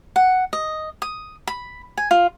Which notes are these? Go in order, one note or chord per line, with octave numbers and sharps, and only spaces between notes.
F#5
D#5
D#6
B5
G#5
F4